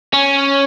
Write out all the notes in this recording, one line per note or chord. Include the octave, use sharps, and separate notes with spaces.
C#4